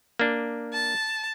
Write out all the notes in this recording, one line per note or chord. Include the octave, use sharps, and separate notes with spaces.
A#3 D4
A5